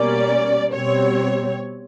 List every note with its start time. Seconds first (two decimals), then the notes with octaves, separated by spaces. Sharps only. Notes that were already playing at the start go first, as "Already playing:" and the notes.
Already playing: B2 G3 A#3 C#4 D5
0.74 B2 G3 C4 C#5